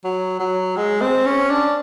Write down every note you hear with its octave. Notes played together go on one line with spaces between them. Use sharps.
F#3
F#3
G#3
C4
C#4
D4